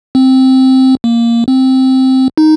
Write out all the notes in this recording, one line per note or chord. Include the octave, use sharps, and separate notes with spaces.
C4
A#3
C4
D#4